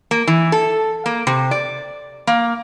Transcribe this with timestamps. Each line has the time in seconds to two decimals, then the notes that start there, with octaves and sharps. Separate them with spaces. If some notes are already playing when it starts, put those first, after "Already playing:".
0.11 A#3
0.27 E3
0.52 A4
1.06 A#3
1.27 C3
1.51 D5
2.27 A#3